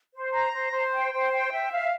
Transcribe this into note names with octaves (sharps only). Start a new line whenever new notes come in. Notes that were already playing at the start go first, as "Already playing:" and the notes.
C5
A#5
C5
C5
G5
C5
G5
E5
F5